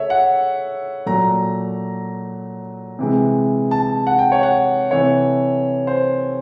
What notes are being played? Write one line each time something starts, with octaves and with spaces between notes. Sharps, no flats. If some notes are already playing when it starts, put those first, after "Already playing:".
Already playing: C#3 A3 C#5 E5
F#5
A#2 F#3 A3 A#5
C3 E3 G#3
A5
F#5
G5
C#5
F#5
C3 E3 A3 C#5
C5